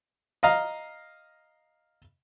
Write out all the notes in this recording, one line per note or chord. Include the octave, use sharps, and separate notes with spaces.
D#5 F5 A#5